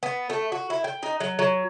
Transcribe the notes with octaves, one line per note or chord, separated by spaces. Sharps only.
B3
A3
F#4
E4
G5
D#4
F#3
F#3